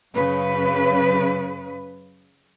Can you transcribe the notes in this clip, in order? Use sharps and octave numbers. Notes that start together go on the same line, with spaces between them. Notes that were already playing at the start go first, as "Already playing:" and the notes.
F#2 C#3 B4